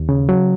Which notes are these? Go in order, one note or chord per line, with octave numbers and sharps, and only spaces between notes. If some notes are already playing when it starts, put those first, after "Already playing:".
Already playing: D#2
C#3
F#3